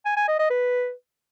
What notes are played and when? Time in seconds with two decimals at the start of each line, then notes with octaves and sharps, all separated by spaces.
0.06 G#5
0.17 G#5
0.28 D#5
0.39 D#5
0.50 B4